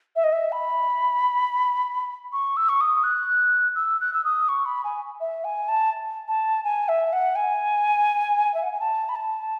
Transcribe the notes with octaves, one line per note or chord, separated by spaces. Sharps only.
E5
D#5
E5
B5
C#6
E6
C#6
D#6
F#6
E6
F#6
E6
D#6
C#6
B5
G#5
E5
G#5
A5
A5
G#5
E5
F#5
G#5
E5
F#5
G#5
A5
B5
A5